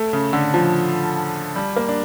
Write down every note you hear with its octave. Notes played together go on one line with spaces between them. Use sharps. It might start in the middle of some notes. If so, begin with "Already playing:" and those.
Already playing: A3
C#3
D3
F3
G3
A#3
D4